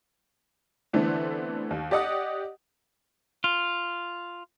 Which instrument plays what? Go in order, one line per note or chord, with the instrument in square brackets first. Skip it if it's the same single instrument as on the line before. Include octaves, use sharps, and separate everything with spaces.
[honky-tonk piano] D3 E3 A3 B3 C4 D4
D#2
G4 D5 D#5 F#5 D#6
[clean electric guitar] F4